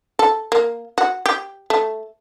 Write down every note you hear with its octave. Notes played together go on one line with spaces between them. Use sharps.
A4
A#3
F#4
G4
A3